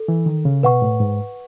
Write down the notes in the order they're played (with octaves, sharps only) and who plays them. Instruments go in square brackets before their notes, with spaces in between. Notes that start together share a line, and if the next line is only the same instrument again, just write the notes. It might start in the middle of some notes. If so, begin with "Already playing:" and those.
Already playing: [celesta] A4
[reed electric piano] E3
D#3
C#3
[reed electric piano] B2 [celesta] B4 F#5 C#6
[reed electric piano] A2
G#2